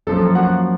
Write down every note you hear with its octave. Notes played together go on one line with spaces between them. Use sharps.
F#2 F3 A#3 A4
F#4 F#5